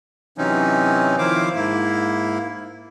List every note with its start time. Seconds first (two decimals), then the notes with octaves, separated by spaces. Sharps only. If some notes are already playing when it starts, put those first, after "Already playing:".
0.38 C3 E3 F#3 C4 C#4 D#4
1.18 D#3 F3 E4 C5 F5 D6
1.55 G#2 A#3 E4